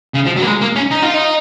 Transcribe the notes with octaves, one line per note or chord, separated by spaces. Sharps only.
C#3
F3
F#3
A#3
G#3
A#3
C#4
D#4
F4
D#4